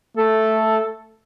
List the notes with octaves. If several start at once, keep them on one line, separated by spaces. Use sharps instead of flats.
A3 A4